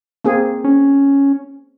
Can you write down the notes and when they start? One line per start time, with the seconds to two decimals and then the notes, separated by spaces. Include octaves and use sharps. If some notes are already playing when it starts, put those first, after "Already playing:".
0.24 A#3 C4 G#4
0.64 C#4